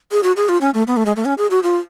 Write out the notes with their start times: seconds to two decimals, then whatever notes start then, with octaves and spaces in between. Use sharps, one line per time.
0.11 G#4
0.23 F#4
0.37 G#4
0.49 F4
0.61 C#4
0.74 A3
0.87 B3
0.97 A3
1.06 G#3
1.16 A3
1.25 C#4
1.38 G#4
1.51 F#4
1.63 F4